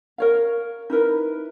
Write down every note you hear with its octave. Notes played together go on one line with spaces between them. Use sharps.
A#4 C#5 F5
D#4 E4 A#4 B4